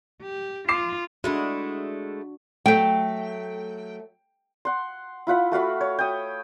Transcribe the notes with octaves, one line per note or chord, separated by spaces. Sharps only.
G4
F4 D6 C7 E7
G#3 A3 D4 E4 F#4
F#3 A3 G5
F#5 C6
E4 F4 F#5 B5
A3 F#4 F5 B5
C#5
G5 D#6